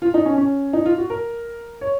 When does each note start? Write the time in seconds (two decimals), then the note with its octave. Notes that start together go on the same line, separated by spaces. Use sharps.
0.02 F4
0.14 D#4
0.26 C#4
0.38 C#4
0.73 D#4
0.86 F4
0.98 F#4
1.10 A#4
1.81 C#5